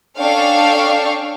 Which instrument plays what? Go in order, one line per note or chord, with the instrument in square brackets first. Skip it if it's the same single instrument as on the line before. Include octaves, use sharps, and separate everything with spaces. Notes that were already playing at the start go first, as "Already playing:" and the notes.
[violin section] C#4 D4 A4 F5 G5 C#6